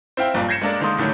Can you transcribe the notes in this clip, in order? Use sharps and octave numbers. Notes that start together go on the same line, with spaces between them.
C4 E4 F5 G5
F#1 G2 A#2 A#3
G6 G#6 A#6 C7 C#7 E7
G#3 A#3 D4 A4 A#4 D5
D3 D#3 G#3 A#3 C6 D#6
A2 D3 D#3 F#3